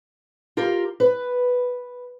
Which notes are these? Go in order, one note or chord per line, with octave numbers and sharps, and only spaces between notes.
F4 G4 A#4 F5
B4